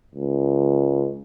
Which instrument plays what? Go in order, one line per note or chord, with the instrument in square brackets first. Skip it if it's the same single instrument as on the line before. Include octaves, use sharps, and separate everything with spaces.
[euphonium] C#2